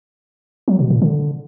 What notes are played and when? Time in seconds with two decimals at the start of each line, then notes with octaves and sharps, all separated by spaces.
0.68 F#3
0.79 B2
0.90 A#2
1.02 D3